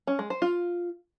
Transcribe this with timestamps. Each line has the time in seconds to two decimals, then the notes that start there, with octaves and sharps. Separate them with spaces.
0.07 C#4
0.19 G#3
0.30 C5
0.42 F4